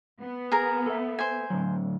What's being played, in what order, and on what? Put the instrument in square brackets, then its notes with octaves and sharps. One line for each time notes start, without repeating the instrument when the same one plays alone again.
[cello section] B3
[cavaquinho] G#4 A#4 A#5
[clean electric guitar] A4 E5
[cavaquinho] C5 G#5
[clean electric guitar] A2 D3 F#3